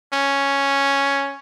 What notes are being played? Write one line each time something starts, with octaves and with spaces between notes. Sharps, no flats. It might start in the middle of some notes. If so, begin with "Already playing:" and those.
C#4